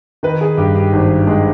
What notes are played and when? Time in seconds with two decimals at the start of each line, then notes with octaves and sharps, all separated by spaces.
0.23 D#3 B4
0.41 G#4
0.57 G2 G4
0.75 G4
0.93 G#1
1.27 G#3